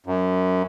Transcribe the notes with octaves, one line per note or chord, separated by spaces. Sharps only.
F#2